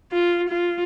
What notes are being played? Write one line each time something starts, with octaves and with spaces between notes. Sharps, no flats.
F4
F4